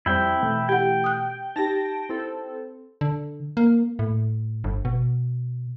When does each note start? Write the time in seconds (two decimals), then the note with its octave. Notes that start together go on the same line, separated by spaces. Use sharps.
0.06 F2 G3 C4 E4 G5
0.42 B2 E3 A3
0.69 G4 F#5 G5
1.04 D#6 F#6
1.56 D#4 G4 A5 A#6
2.09 C4 E4 A4
3.01 D3
3.57 A#3
3.99 A2
4.64 G1
4.85 B2